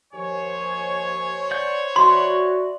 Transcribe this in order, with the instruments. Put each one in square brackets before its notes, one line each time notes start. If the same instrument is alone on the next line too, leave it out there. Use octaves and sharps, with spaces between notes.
[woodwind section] D#2 F3 G#5 [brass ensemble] C5 C#5
[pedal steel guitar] D5 F#5 G6
[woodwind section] F#4 [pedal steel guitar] D5 E5 B5 [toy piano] C6